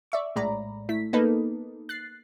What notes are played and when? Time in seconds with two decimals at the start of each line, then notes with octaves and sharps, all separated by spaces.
0.12 D5 E5 C#6
0.36 A#1 A2 G#3 D5 A#5 B5
0.89 A3 E4 B6
1.13 A#3 B3 D#4 A4 B4
1.89 F#6 A6 C7